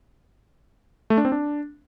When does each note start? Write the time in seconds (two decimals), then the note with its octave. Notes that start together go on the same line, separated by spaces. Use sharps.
1.10 A3
1.17 D4
1.25 C4
1.32 D4